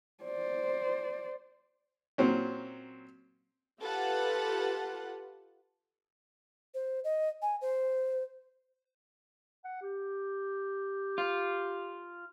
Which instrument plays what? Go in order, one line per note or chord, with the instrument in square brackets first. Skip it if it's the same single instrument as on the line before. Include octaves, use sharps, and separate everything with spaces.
[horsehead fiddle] C5 D5
[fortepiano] A#2 F#3 C4 C#4
[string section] F4 G4 A4 B4 F#5
[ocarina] C5
D#5
G#5
C5
[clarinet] F#5
G4
[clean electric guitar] F4